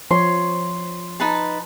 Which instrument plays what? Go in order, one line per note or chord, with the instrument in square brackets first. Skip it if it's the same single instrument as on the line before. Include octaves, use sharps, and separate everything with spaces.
[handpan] F3 C#5 [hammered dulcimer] C6
[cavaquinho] D#4 B4 A5